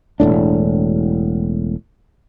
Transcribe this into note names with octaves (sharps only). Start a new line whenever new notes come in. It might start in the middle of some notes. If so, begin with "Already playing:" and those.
E1 A#1 A2 D4